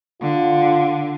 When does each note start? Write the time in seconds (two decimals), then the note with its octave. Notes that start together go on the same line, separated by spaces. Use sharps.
0.22 D3 F4